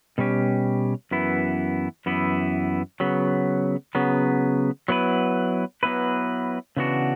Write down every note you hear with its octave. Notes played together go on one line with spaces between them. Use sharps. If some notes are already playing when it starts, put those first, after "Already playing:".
B2 G3 C#4 G4
F#2 E3 B3 E4
F#2 E3 B3 E4
C#3 F#3 B3
C#3 F#3 B3
F#3 B3 E4 B4
F#3 B3 E4 B4
C#3 E3 B3 D4 F#4